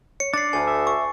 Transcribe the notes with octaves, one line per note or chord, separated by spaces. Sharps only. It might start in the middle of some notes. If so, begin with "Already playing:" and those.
C#5 C#7
D4 D5 D6 A6 C7
D2 G#5
E5
C#6